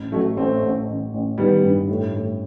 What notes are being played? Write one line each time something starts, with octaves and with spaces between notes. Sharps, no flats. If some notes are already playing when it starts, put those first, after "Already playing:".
Already playing: A1
A1 F#3 A3
A1 A3 C4
A1
A1
A1
D#3 G3 B3
G2
A2
A2